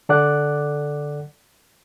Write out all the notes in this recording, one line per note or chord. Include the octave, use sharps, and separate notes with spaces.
D3 A4 D5 F#5 D6 F#6